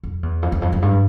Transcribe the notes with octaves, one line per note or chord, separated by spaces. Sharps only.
F2
E2
F2
E2
F2
F2
G2